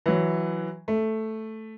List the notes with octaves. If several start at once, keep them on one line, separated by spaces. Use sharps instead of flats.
E3 F#3
A3